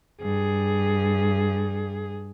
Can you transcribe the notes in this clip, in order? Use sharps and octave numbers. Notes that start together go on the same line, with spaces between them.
G2 G#4